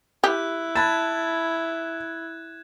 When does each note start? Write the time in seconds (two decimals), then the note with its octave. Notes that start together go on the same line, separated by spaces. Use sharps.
0.24 E4 G4 F#6
0.76 A5 B5 F#6 G#6 A6 E7